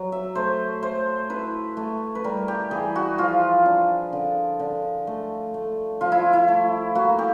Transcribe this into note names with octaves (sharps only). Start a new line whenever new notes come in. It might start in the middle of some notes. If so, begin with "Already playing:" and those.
Already playing: F#3
E5
A3 C5
A3 C5
E4 B4
A3
B4
G3 A#4
G4
E3 G#4
F#4
F3 F4
D4
D3
D3
A3
A3
F3 F4
E4
E4
A3
A#3 F#4
G4